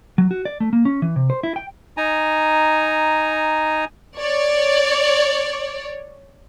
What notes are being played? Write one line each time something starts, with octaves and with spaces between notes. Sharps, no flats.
F#3
F#4
D5
A3
A#3
C#4
E3
C3
C5
E4
G5
D#4 G#5 A#5
C#5 D5